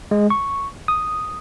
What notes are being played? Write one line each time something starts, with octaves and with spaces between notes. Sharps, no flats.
G#3
C#6
D#6